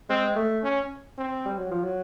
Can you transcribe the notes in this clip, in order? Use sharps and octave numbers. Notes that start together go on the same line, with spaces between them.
G#3 C4
A3
C#4
C4
G3
F#3
F3
F#3